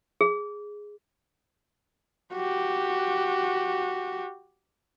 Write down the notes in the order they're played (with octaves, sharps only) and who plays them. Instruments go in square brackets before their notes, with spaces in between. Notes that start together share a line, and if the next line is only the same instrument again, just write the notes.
[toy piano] G#4
[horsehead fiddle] F#4 G4